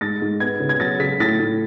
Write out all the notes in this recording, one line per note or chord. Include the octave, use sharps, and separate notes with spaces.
G#2 A6
G#2
B3 G#6
C#3
G#6
F#3 A6
C#3 B6
A2 A6
A2